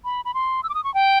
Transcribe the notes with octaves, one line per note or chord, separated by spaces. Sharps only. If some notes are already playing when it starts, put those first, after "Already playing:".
B5
B5
C6
E6
D6
D#6
C#6
G5